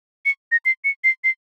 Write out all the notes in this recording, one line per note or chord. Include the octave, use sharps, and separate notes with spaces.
C#7
A#6
C7
C#7
C7
C7